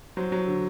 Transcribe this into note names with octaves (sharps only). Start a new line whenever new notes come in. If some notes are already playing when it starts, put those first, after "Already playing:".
F#3 C5
F#3
D3